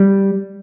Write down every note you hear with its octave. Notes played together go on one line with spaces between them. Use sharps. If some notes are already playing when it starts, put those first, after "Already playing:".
Already playing: G3